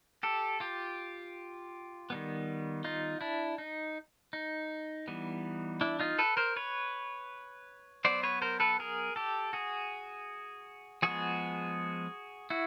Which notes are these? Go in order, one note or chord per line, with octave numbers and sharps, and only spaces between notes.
G4 A4
F4 G4
D#3 G3 B3
D#4 F4
D4 E4
D#4
D#4
E3 G3 B3
D4 E4
D#4 F4
A4 B4
A#4 C5
B4 C#5
F#3 B3 C5 D5
B4 C#5
A#4 C5
A4 B4
G#4 A#4
G4 A4
F#4 G#4
F3 G#3 B3 F#4 G#4
E4 F#4